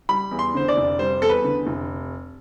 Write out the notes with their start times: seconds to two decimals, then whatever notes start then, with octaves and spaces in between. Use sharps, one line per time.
0.09 G3 B5
0.31 E2
0.39 C6
0.55 D3 C5
0.68 D5
0.77 F1
0.99 G3 C5
1.21 E2 A4
1.29 B4
1.44 D3
1.67 F1